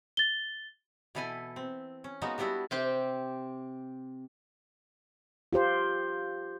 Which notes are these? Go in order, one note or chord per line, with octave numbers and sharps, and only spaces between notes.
A6 G7
B2 E3 E4 A4 G#5
C4
C#4
G#3 A#3 B3 D#4 F#4
G3 B3 D4 E4 F#4
C3 C4 G4 C5
F4 G4 C5